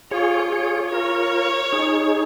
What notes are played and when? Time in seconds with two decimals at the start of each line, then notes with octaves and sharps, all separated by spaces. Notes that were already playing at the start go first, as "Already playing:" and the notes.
0.11 F4 G#4 C#5
0.52 F4 G#4 C#5
0.92 F4 A#4 C#5
1.73 D#4 G#4